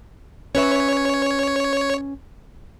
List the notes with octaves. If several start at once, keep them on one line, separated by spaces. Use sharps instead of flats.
C#4 B4 C#5 E5